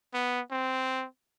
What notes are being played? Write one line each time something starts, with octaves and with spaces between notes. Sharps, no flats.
B3
C4